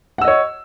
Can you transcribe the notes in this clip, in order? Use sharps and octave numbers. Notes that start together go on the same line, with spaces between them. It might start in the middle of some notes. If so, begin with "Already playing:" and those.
C#5 D#5 F#5 E6